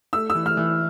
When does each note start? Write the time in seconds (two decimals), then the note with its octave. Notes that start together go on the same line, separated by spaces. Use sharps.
0.13 A3 E6
0.30 E6
0.35 E3
0.46 F6
0.57 E3